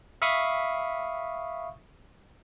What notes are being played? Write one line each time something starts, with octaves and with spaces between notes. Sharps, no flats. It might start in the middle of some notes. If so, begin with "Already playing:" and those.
E5 F5 B5 C#6 D#6